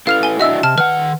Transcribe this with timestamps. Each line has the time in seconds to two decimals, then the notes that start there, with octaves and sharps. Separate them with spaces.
0.07 E4 A4 B4 F5 F6 F7
0.23 G#5 G7
0.40 D4 E4 F#4 D#5 E5 E6
0.63 C3 A5 F6
0.78 D#3 B4 F#5 F6